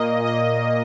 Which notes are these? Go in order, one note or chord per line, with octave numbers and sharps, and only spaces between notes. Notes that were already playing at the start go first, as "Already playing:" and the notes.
Already playing: A#2 A#3 D#5
D#5